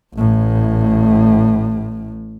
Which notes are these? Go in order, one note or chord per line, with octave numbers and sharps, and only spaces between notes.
A1 A2